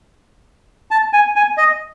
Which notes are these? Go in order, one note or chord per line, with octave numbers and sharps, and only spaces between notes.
A5
G#5
G#5
D#5